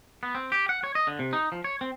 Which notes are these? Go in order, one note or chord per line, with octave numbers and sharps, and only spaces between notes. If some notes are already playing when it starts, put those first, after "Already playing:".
B3
C4
G4
F#5
C#5
D#5
D3
C3
D#4
F3
C#5
C4